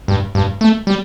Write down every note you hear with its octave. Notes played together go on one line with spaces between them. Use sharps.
G2
G2
A3
G3